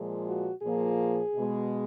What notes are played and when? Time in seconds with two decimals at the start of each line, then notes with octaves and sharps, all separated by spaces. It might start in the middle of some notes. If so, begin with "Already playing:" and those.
Already playing: A#2 F3 G#3
0.28 F#4
0.63 A#2 F3 A#3 G#4
1.35 B2 G#3